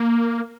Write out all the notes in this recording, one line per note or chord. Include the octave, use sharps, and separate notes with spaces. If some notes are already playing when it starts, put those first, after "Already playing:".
Already playing: A#3